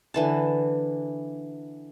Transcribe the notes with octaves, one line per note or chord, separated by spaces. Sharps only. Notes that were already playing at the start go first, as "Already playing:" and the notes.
D3 E3 A5